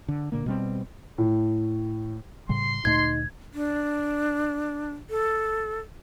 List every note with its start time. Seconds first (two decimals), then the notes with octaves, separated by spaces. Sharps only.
0.08 D3
0.32 A#2 D3 A#3
0.46 B2 G3 C4
1.18 A2
2.49 A2 C#3 G3 C6
2.85 D2 A#2 A3 D#4 G#6
3.54 D4
5.10 A4